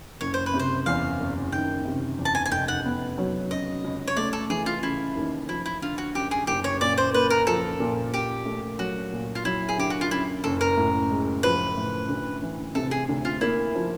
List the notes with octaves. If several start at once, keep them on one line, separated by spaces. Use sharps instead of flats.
F#1 C#5
C5
B4
C3
C5
E2 F5
F#1
D#3 G5
C3
E2
A5
G#5
G#5
F1 G5
F#5
B3
F#3
C#3 D#5
C#2
C#5
A3 D5
A4
E3 G#4
F4
C#3 E4
D#2
F3 E4
E4
D3 F4
F#4
F#2 G4
G#4
F#1 G4
C#5
A#2 D5
C5
A#3 B4
A#4
F3 A4
A#2
A#2 G4
A3
F#3 F#4
A#2
F4
F#3 E4
G#4
D3 G4
F#4
F4
F#2 E4
F#1 A4
A#4
A2
G#3
F3 B4
A2
D2
E3
C3 A4
G#4
D2
F4
A#3 E4
F3